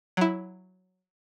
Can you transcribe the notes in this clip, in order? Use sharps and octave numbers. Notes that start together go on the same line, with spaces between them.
F#3 E4